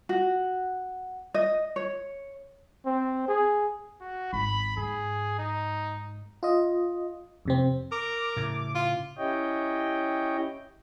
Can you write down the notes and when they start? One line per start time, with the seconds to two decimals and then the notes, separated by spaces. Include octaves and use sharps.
0.09 F#4
1.34 D#5
1.76 C#5
2.86 C4
3.28 G#4
4.01 F#4
4.33 G#1 B5
4.77 G#2 G#4
5.39 D#4
6.43 F4 D#5
7.45 F2 C3 C4
7.92 A#4 D6
8.37 A2 C#3
8.75 F4
9.18 C#4 E4 G4 C#5 D#5 G5